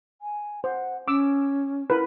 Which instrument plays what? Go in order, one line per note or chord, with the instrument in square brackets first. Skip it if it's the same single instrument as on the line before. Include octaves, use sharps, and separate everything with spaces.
[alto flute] G#5
[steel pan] C5 [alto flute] F#5
[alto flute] C#4 [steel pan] D6 E6
[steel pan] E4 A#4 B4